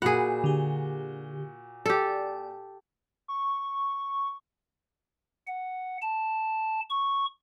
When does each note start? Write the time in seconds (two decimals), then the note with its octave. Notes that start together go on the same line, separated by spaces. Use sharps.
0.02 A#2 F#4 G#4 F#5 B5
0.44 D3 G4
1.86 G4 A4 D5
3.28 C#6
5.47 F#5
6.02 A5
6.90 C#6